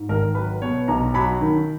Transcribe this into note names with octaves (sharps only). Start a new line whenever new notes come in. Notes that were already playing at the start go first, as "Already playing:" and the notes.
Already playing: G#2
G#1 A#4
F#3 B4
B2 C#5
B1 A#5
F#3 B5
D#3